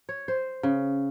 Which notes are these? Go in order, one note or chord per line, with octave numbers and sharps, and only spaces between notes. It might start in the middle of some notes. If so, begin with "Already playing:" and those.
C#5
C5
C#3